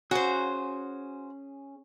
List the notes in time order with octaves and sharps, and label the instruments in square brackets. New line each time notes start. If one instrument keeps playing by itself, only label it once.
[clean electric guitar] C#4 G#4 [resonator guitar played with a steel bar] F#4 C5